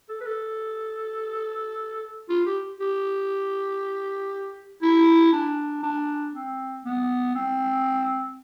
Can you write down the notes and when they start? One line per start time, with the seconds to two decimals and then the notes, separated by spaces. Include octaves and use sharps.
0.09 A4
0.21 B4
0.26 A4
2.29 F4
2.46 G4
2.80 G4
4.82 E4
5.32 D4
5.83 D4
6.34 C4
6.85 B3
7.35 C4